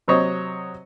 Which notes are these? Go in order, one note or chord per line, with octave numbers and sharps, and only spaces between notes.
C3 F#3 C5 C#5 D#5